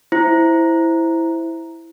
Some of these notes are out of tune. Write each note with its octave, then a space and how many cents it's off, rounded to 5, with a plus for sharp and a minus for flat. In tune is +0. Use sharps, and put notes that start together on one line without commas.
E4 +0 C5 +0